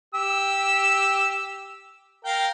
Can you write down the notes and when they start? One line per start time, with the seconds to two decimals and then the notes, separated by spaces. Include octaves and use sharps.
0.14 G4 E6
2.25 A#4 F5 G5